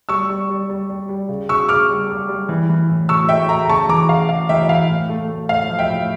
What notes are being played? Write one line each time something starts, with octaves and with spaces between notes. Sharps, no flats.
G3 C#6 E6
G3
G3
G3
G3
G3
C#3
C#3 C#6 E6
C#3 D6 F6
G3
G3
G3
E3
E3
A2
A2 C#6 E6
A2 E5 G5
A3 G5 A#5
A#5
C#3 A5 C#6
E3 A#5 D6
C#3 F5
C#3 F5
E3 E5 G5
E5
E3 F5
A2
A3
A3
A2 F5
F3
E5 G5
A2